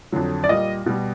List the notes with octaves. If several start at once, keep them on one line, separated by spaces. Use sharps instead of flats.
F2 D3 F#3
D5
A#2 G3 D#5
B2 G3